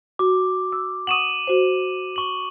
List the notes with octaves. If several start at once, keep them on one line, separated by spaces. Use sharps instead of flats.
F#4 D6
E6
F#5 C#6 D#6 D#7 E7 F#7
F#4 C5
C#6 F#7